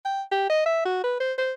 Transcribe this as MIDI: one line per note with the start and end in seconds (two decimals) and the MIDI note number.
0.05 0.22 79
0.32 0.47 67
0.50 0.64 75
0.66 0.84 76
0.85 1.02 66
1.04 1.16 71
1.21 1.33 72
1.38 1.52 72